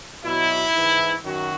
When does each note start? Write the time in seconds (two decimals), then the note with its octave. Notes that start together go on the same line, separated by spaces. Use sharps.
0.24 B2 F#3 E4
0.73 G#2 E3
1.23 F#2 D#3 F#3 F#4